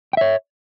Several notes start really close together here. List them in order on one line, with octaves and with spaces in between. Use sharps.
G5 E5 C#5